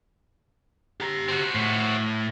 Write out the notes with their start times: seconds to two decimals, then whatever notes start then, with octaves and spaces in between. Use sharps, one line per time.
1.00 G4 A#5
1.28 C4 F#4
1.55 A2